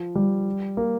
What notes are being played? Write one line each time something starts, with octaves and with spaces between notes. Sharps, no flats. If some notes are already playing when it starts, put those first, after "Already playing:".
Already playing: F3
G3
A#3